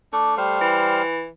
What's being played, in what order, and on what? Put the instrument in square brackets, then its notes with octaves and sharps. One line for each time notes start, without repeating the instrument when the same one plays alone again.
[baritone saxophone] A3 [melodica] D4
[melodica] G3 C5 F5
[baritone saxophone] E3